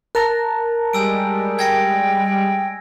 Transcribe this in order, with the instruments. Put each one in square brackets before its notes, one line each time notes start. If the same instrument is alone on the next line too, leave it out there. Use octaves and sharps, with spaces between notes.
[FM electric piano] A#4 A5 A#5 [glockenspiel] F#6
[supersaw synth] G3 G#3 [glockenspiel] G#5 E6 D7
[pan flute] G5 [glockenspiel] G#6 A#6 C#7